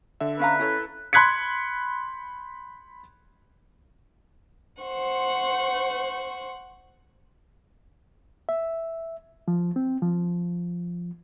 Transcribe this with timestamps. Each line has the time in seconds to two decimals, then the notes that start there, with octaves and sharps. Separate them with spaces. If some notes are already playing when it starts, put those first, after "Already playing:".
0.20 D3 E5
0.39 C#4 B4 F5 A#5
0.59 C#4 E4 A4 C#5
1.13 B5 C6 F#6 G#6 B6 C#7
4.82 C5 F#5 C#6
8.49 E5
9.48 F3
9.76 C4
10.02 F3